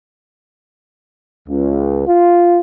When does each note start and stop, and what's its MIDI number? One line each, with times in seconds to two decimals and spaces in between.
1.49 2.03 37
2.07 2.60 65